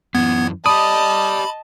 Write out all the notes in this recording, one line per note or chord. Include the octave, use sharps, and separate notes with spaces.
F#2 E3 B3 G#6
G4 D5 D#5 A5 B5 D#6